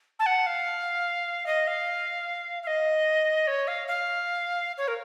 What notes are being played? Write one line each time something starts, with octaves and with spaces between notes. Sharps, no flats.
A5
F#5
F5
D#5
F5
F5
D#5
C#5
F5
F5
C#5
A#4